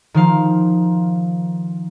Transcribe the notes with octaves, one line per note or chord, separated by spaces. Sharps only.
D#3 F3 F5